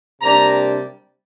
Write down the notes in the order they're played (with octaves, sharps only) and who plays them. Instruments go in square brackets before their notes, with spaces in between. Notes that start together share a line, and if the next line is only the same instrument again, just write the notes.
[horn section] C3 G3 A#3 D4 A#5